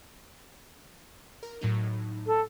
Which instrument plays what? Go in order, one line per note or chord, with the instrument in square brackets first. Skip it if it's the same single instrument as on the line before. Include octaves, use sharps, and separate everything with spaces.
[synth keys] A#4
A2 F#3 D#4
[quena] A4